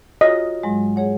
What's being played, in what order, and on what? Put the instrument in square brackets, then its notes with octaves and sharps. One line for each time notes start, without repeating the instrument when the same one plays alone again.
[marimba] F4 F#4 C#5 [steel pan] D#5
[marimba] G#2 F#3 G#3
G#4 C#5 F#5